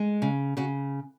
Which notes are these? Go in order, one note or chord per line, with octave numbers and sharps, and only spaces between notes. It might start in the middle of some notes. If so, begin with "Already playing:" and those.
Already playing: G#3
C#3
C#3 F#4